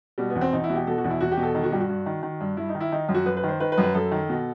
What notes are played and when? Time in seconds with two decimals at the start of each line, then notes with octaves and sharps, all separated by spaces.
0.18 B2 G3
0.30 B3
0.35 E2
0.41 C4
0.53 E2 D#4
0.64 E4
0.69 B2
0.75 G4
0.87 B2 A4
0.98 F#4
1.04 E2
1.10 E4
1.20 E2 F#4
1.32 G4
1.37 B2
1.43 A4
1.55 D#3 A4
1.64 F#4
1.71 G2 G4
1.80 F#4
1.89 G2
2.06 D#3
2.23 D#3
2.40 G2
2.57 G2 E4
2.69 D#4
2.75 D#3
2.80 E4
2.92 D#3 D#4
3.08 F#2
3.14 F#4
3.26 F#2 B4
3.37 B4
3.44 D#3 C5
3.60 D#3 B4
3.72 B4
3.78 F#2
3.83 B4
3.94 F#2 A4
4.11 D#3
4.29 B2